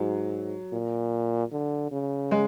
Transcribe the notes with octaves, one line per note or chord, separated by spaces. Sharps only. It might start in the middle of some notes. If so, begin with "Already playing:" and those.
Already playing: G#2 F#3
A#2
D3
C#3
G#3